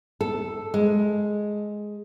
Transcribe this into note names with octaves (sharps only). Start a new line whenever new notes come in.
A4
G#3